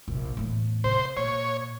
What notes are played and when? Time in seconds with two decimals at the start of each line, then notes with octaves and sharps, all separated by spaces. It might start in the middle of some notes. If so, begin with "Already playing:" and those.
0.08 A#1 C3
0.37 E2 A2
0.84 C3 C5
1.17 A#2 C#5